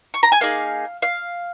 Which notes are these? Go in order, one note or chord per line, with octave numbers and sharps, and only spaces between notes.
C#6
A#5
G#5
A#3 D#4 G#4 F5
F5